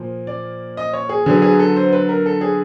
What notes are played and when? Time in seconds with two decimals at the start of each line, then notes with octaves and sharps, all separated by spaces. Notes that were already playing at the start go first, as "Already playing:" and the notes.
Already playing: A#2 F3 A#3
0.27 D5
0.77 D#5
0.93 C#5
1.09 G#4
1.26 D3 F#3 B3 G#4
1.42 G#4
1.59 A4
1.76 C5
1.93 B4
2.09 A#4
2.26 A4
2.41 G#4